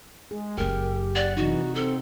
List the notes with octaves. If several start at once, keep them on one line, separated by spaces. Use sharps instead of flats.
G#3 G#4
F#1 F#2 G4 A#4
D5 F#5
C3 E3 D#4 F#4
C4 A4